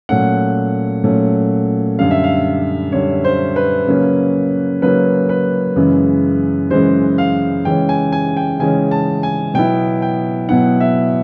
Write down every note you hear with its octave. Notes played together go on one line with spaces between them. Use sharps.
A#2 F#3 A3 C#4 F#5
A#2 F#3 A3 C#4
F#2 D3 G3 F5
E5
F5
F#2 D3 G3 C#5
C5
B4
C#3 F#3 A#3 C#4
C#3 F#3 A#3 C#4 B4
B4
F#2 C#3 E3 G#3
F#2 C#3 E3 G#3 C5
F5
C#3 E3 G#3 C#4 G5
G#5
G#5
G5
C#3 E3 G#3 C#4 G#5
A5
G#5
B2 F#3 B3 E4 G5
G5
B2 F#3 B3 E4 F#5
E5